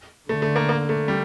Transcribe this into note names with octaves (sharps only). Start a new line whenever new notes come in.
D3 A3
A3
A#3
A#3
A3
G3